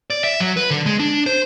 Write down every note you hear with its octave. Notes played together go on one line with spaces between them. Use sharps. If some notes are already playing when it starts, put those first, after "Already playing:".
D5
E5
F#3
B4
D3
G#3
D4
C5